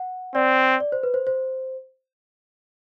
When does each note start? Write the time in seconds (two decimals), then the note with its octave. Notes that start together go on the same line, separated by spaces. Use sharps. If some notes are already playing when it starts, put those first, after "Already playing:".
Already playing: F#5
0.35 C4 D5
0.80 D5
0.92 C5
1.03 B4
1.14 C5
1.27 C5